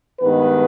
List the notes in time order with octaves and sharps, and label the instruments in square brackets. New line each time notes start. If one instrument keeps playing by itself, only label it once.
[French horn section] G2 D#3 G#3 B3 B4